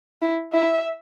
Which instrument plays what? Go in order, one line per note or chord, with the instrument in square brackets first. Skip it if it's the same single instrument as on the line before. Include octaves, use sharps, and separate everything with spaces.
[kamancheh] E4
[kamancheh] E4 [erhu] E5